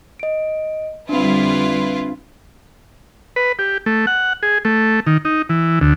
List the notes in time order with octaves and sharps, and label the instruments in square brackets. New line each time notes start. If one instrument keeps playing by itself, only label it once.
[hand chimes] D#5 D7
[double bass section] F2 D3 G3 [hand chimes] C4 D4 [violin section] E4 F4 B4
[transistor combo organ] B4
G4
A3
F#5
G#4
A3
D#3
D#4
E3
D2